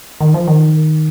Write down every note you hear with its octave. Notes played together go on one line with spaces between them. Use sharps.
D#3
F3
D#3